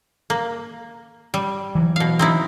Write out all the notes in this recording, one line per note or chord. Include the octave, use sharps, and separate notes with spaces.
A#3
G3
E3 F#3
B2 F5
C4 D#4 E4